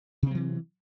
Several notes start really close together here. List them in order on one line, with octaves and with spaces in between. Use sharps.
C3 C4 F#3 E3